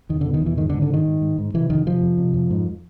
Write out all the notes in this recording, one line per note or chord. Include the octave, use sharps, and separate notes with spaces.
E2 D#3
D3
B2
D#3
E2 E3
G#2 D#3
D3
G#2
D3
G#2 D#3
G#2
G#2
G#2
C3 E3
F2 D#3
C3 F3
F2
C3
F2
G#2